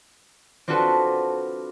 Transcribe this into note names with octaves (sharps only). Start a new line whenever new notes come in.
C4 D4 F4 F#4 A4 B4